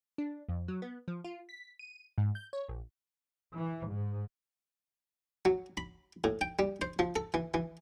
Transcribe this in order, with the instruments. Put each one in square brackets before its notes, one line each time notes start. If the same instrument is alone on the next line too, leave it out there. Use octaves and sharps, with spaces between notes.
[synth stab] D4
F2
F#3
B3
F3
F4
B6
D#7
G#2
G6
C#5
A#1
[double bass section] E3
G#2
[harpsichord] F#3
B5
A2
G5
G3
C5
F3
A4
E3
E3